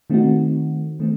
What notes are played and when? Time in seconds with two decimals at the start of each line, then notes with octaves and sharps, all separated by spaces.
0.10 D#3 A3 C4 D#4 F#4
1.00 D#3 A3 C4